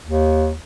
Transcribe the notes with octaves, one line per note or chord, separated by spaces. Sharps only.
D#2